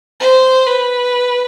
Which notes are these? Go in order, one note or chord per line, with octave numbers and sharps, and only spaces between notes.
C5
B4